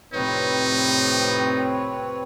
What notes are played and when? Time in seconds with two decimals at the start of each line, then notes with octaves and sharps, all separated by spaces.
0.13 F2 A2 C3 C4 D#4 B4 C#5